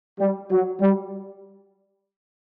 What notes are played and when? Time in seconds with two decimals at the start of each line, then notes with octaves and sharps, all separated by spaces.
0.19 G3
0.51 F#3
0.81 G3